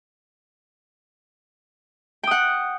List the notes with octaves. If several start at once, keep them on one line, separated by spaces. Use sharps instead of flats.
F#5 G5 D#6